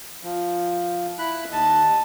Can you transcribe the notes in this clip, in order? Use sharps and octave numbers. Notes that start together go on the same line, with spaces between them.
F3
E4 B5 F#6
D#2 D#5 A5